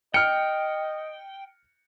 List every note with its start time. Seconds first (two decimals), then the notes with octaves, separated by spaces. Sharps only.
0.14 D#5 G5 F6 C#7